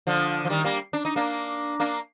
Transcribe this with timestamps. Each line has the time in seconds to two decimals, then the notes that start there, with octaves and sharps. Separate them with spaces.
0.07 D3 F3
0.45 F3
0.49 D#3 G3
0.64 G3 A#3
0.93 D4
1.05 D#4
1.16 A#3 D4
1.80 A#3 D4